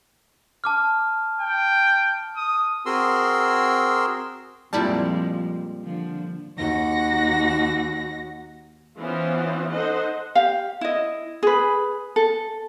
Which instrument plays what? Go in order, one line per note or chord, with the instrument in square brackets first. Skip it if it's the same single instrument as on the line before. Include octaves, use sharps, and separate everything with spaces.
[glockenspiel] A5 D6 F6
[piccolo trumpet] G5
D#6
[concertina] C4 F#4 G#4 A#4 C6 E6
[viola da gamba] F2 F3 G#3 [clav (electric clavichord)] A#2 G3 [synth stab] E4 D5 A5
[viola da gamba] D3 F3
[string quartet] D#2 F#4 A#6
[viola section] E3 B3 C#4 F4 C5
D#4 A4 C5 D#5 F#5
[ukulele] G4 F5
E4 D#5
G#4 B4
A4